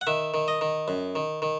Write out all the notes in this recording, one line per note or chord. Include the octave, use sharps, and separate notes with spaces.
F#5
D#3 E5
D#3
D#5
D#3
F#2
D#3
D#3